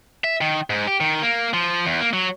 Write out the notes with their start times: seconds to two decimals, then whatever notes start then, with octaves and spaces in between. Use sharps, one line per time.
0.24 E5
0.41 D#3
0.70 G#2
0.87 G4
1.00 D#3
1.22 A#3
1.53 F3
1.86 E2
2.01 A#3
2.13 F#3